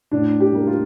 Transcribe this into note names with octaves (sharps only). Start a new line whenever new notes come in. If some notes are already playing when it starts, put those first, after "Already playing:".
A2 D4
G4
G3 A#3
F4